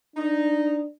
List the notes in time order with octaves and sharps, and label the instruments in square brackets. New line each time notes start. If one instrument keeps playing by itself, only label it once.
[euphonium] D4 [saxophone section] D#4